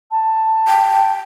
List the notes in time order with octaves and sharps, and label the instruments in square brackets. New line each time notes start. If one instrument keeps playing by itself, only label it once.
[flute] A5
[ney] G5